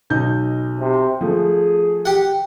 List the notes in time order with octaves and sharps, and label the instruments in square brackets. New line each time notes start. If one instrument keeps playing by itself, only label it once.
[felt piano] B1 D#4 G6
[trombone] C3
[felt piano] F3 A3 [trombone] G#4
[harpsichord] G4 F#5